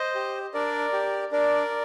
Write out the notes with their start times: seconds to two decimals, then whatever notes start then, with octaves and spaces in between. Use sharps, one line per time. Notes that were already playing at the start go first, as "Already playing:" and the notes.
Already playing: C5 D#5
0.15 G4
0.54 D4 A#4 D5
0.93 G4
1.32 D4 A#4 D5